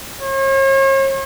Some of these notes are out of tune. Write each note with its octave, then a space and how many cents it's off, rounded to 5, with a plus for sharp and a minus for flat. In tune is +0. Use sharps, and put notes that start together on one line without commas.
C#5 -45